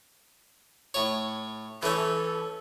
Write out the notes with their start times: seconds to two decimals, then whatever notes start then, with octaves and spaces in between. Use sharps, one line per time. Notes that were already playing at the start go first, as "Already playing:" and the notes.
0.94 A2 C#5
1.83 E3 C#4 A4